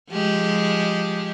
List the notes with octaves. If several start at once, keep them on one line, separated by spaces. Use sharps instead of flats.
F3 G#3 G4